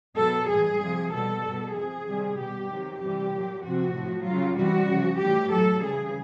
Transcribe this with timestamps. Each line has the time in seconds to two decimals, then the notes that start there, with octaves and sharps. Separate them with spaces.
0.18 B2 F#3 A4
0.49 A2 E3 G3 G#4
0.82 C3 F3
1.12 B2 G3 A4
1.44 B2 G3
1.75 C3 F3 G#4
2.07 C3 D#3 G3
2.38 B2 G3 G4
2.70 C3 D#3 F#3
3.00 C3 E3 G3 G4
3.33 A#2 F#3
3.63 C3 F3 F#4
3.95 A2 F3
4.26 C#3 F#3 F4
4.57 C3 E3 G3 F#4
4.88 C#3 F3
5.20 A2 E3 G3 G4
5.52 A2 F#3 A4
5.82 C#3 E3 G3 G#4